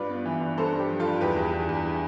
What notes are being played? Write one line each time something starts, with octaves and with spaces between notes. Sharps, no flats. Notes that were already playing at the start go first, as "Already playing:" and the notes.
Already playing: G2 F4 B4 D5
B3
E3
G2
G2 A4 C5
G2
G4
F3
F4 A4
G2
E2 G4 B4
E2
E2
E2